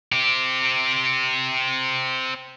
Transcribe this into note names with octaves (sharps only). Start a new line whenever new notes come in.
C4 G4